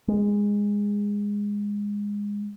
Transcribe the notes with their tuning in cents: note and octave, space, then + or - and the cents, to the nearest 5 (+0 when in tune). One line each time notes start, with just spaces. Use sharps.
G#3 -15